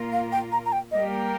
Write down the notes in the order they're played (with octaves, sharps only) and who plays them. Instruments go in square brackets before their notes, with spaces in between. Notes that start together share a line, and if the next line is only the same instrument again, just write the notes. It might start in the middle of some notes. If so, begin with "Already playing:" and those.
Already playing: [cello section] A#2 A#3 F4 A#4
[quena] F5
G5
A#5
A#5
G5
[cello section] G3 A#3 G4 A#4 [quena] D#5